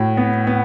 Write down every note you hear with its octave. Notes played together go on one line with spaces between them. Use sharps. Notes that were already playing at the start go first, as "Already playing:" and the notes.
Already playing: A2 F#4
B3
B3